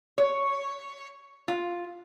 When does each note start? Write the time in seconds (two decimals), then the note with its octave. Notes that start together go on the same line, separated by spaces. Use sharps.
0.18 C#5
1.48 F4